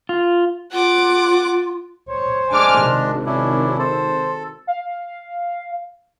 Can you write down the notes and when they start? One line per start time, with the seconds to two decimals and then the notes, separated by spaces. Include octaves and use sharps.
0.09 F4
0.72 F4 F#5 D6
2.09 C5 C#5
2.52 G#3 D4 G#5 D6 F6
2.83 G#1 C3
3.26 C#4 D4 E4
3.79 A4 C5
4.67 F5